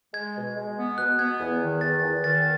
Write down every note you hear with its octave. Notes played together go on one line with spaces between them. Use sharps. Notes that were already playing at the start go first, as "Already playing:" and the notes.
G#3 G#6
B2
G#3
B3
B2 F#6
B3 G#6
E2
D#3
E2 A6
E2
D#3 A6